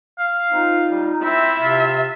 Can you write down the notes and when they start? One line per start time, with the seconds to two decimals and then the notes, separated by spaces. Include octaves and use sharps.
0.19 F5
0.52 C4 D#4 F4
0.90 G3
1.23 C4 E4 E5
1.60 C3 F4